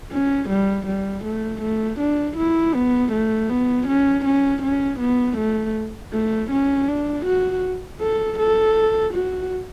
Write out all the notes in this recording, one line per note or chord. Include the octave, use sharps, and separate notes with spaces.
C#4
G3
G3
A3
A3
D4
E4
B3
A3
B3
C#4
C#4
C#4
B3
A3
A3
C#4
D4
F#4
A4
A4
F#4